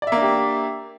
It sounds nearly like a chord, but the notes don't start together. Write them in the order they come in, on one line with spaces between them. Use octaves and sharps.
D5 E5 A#3 D4 G4